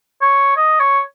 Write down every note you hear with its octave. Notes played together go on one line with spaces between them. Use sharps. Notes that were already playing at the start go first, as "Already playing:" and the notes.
C#5
D#5
C#5